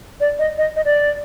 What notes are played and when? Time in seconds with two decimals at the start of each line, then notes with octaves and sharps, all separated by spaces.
0.20 D5
0.39 D#5
0.58 D#5
0.76 D#5
0.85 D5